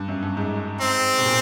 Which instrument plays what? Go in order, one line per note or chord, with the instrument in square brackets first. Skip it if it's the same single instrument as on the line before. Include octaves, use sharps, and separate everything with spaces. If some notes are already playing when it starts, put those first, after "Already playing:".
Already playing: [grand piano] G2
F#2
G2
G#2
[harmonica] C4
[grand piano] B2
A#2